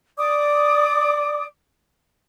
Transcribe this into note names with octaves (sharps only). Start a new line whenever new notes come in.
D5 D6 D#6